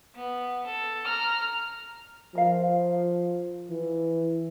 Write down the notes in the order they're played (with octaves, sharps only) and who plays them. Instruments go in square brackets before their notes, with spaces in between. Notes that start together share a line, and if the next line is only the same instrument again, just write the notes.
[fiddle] B3
A4
A#5 F6
[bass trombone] F3 [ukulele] A#4 F5
[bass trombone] E3